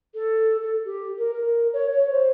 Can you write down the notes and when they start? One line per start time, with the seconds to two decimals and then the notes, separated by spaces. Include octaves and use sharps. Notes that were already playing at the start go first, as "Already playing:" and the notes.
0.15 A4
0.63 A4
0.85 G4
1.18 A#4
1.33 A#4
1.73 C#5
1.91 C#5
2.11 C5